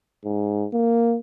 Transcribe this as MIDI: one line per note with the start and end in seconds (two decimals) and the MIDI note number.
0.25 0.66 44
0.73 1.17 58